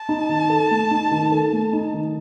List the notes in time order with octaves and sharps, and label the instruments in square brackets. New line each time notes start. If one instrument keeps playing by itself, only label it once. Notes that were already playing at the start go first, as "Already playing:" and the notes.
Already playing: [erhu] A5
[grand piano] D#4
D#3
A4
A3
D#4
D#3
A4
A3
D#4
D#3